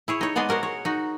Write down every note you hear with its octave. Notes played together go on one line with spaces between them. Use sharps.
E4 G#4 C#5
D#4 C#5
G#3 B3 G#4 D5 D#5
F#4 A#4 C5 C#5
C#5
D#4 F#4